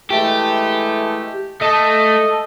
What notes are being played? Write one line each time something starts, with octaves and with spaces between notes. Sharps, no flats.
E3 G#3 A3 G4
A3 A4 D#5